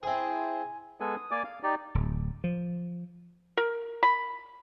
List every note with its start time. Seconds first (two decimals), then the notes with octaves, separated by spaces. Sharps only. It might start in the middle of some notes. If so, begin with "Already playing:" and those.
0.03 C4 E4 G#4 C5 G#5
1.00 G#3 B3 A4 G#5
1.17 D#6
1.31 A#3 D5 G#5 D6
1.44 F5
1.63 D#4 G4 D5
1.95 D1
2.44 F3
3.57 A#4
4.03 B5